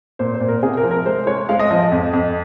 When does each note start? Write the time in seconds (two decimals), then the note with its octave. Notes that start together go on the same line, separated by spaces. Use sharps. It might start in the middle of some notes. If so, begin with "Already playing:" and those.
0.19 A#2 C5
0.34 C5
0.41 A#2
0.48 A#4
0.63 C3 G#4
0.77 A#4
0.83 F3
0.91 A#4
1.05 G#3 C5
1.27 G#3 C#5
1.49 G#3 F5
1.59 D#5
1.70 F3 D#5
1.81 D#5
1.92 F2
2.13 F2